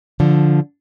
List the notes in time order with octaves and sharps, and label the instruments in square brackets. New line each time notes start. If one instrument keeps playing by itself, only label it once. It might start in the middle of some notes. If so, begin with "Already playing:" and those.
[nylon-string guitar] D3 F3